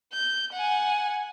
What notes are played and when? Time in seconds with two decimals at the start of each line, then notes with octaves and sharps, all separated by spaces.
0.13 G6
0.53 F#5 G#5